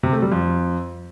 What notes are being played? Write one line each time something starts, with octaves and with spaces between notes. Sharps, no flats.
C3
A3
G3
F2